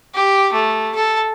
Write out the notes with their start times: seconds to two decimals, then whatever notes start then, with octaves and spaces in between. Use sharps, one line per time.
0.15 G4
0.53 A3
0.95 A4